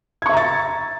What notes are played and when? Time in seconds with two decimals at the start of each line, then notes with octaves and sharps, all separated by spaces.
0.22 G#6
0.26 C#6
0.29 E5
0.33 A#5
0.37 A6